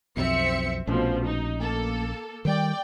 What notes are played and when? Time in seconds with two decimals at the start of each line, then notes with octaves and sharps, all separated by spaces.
0.17 B1 F2 C4 E5 C#7
0.87 A#1 B2 F3 A3 C#4
1.25 D#4
1.60 A#3 A4
2.45 D#3 G3 D5 G5